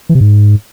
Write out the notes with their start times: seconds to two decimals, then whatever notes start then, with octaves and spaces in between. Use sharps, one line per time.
0.09 E3
0.15 C3
0.21 G#2